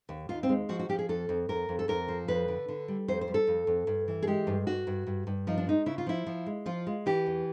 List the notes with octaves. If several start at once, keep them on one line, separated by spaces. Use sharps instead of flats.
D#2
D#2 F4
C4
G#3
F3 F#4
F#4
F3 G4
G#4
F2 A4
F2
F2 A#4
F2
A4
F2 A#4
F3
F2 B4
D3
D3
G3
F2 C5
C5
G3
A4
F2
F2
G2
E3
G#4
G#3 G4
G2
G2 F#4
G2
G2
G2
F3 D#4
D4
G#3 D#4
C#3 E4
F4
F3 E4
F3
G#3
F3 F4
G#3
E3 G4
E2